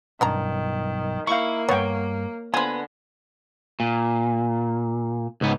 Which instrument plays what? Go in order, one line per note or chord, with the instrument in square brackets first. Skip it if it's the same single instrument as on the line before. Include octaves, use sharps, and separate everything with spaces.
[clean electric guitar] B1 G2 [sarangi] D#3 [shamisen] C#4 D4 A#5
[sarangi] A#3 [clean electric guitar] E4 [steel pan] F5 C#6
[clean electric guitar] D2 G2 [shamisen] B3 F#5 [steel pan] C#5 G5
[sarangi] D3 [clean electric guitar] B3 B4 [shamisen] F4 C5 [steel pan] G#5
[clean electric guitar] A#2
C#2 G#2 B3